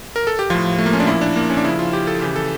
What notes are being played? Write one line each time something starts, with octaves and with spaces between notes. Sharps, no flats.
A#4
A4
G4
A2 F3 F4
A3
A#3
C#4
D4
A#2 F3 E4
D4
A#3
C#4
D4
C#3 F3 E4
F4
G4
A4
C#3 E3 G4
A4